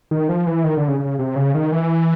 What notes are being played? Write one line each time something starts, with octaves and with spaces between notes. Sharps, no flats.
D#3
F3
E3
D#3
D3
C#3
C#3
C3
C#3
D#3
E3